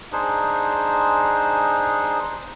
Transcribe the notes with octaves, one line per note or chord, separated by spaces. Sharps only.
D4 D#4 G#4 C5